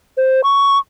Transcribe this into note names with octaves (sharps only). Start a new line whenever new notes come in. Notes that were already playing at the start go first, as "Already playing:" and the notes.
C5
C#6